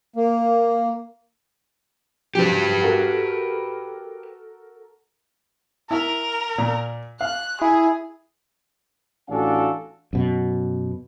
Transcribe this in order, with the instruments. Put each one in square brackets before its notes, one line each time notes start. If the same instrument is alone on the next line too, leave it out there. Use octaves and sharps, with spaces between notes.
[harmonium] A#3
[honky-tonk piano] C#3 F3 F#3 [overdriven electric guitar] G4 B4
[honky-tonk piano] F#4 A4 A#4
[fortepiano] E4 [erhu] A#4
[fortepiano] A#2
[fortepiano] F5 [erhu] F#6
[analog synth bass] E4 [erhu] G#4
[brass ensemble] A1 D4 F#4 A4 F5 G#5
[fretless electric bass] F#2 B2